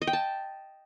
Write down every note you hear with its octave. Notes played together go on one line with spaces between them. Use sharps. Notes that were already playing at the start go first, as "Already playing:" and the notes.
D#5
G5
A5